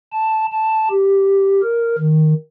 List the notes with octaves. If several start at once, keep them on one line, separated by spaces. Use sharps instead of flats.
A5
A5
G4
A#4
D#3